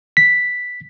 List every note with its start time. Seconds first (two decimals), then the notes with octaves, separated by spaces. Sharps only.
0.17 B6